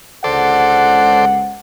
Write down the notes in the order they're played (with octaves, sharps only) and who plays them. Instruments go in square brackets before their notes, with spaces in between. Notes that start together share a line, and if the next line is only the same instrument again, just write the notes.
[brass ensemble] C#2 F#5 [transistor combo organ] A4 C5 D5